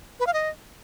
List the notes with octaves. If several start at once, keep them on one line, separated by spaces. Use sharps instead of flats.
B4
F5
D#5